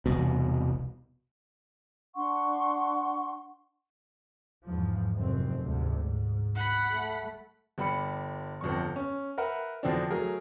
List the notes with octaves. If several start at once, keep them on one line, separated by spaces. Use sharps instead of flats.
E1 C2 B2
D4 F#5 C6 C#6
E2 G#2 F3
F1 F#2 C4
D2 G#2 C3
G#2
F#5 B5
A3
G1 G3 B5 C#7
G1 F2 G3 C#6
C#4
A#4 B4 E5 F#5 G5
F2 B2 D3 E3 C4 D4
F#3 A3 G#4 A#4